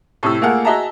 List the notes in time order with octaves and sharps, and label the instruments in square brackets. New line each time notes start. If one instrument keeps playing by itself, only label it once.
[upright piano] A2 C3 E6
A3 A#3 F4 G#4 A#4 F#5
F#4 G#4 D#5 E5 A5 A#5